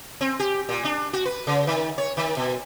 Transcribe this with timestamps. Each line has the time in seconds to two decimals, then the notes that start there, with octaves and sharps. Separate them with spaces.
0.21 C4
0.40 G4
0.69 A#2
0.85 D4
1.13 F#4
1.25 B4
1.47 C#3
1.67 D#3
1.98 C#5
2.17 D#3
2.37 B2